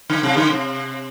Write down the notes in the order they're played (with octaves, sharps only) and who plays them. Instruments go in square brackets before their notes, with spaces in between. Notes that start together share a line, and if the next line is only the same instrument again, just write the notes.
[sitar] D3
C3
D3
C3